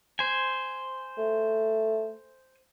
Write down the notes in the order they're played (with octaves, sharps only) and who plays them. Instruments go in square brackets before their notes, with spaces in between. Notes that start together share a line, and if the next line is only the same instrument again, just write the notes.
[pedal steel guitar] C5 G#5
[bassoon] A3